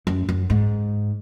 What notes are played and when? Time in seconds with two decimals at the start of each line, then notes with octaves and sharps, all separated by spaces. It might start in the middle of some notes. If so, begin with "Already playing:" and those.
0.07 F#2
0.29 F#2
0.50 G#2